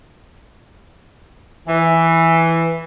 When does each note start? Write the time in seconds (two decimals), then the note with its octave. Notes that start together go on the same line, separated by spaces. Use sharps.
1.67 E3